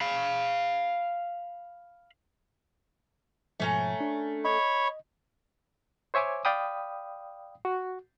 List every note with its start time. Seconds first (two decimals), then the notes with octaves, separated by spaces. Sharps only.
0.01 F5 B5
3.60 G#2 B2 F3 A3 C#4 A#5
4.00 D4
4.45 C#5 D#5 B5 C#6
6.14 C5 C#5 E5 G#5 D6
6.45 D5 F5 G5 B5 D#6
7.65 F#4